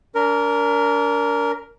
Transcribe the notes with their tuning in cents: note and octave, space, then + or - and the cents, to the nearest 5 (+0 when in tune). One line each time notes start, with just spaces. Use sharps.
D4 -40 A#4 +0